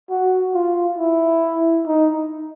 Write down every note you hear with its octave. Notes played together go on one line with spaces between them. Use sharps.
F#4
F4
E4
D#4